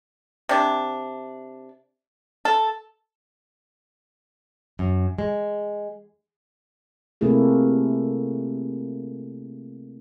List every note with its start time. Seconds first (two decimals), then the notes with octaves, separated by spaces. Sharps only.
0.49 C3 D4
2.45 A4
4.79 F#2
5.18 G#3
7.21 C3 A3 A#3 E4 G#4